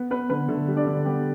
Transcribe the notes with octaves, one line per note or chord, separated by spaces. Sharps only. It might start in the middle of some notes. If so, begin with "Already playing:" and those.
Already playing: B3
B3 B4
D3 B3 B4
D3 A3 A4
G3
D4 D5
D3
G3 B3 G4